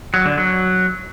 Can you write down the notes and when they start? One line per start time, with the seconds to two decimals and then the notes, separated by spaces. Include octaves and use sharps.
0.14 F#3
0.26 D3
0.38 F#3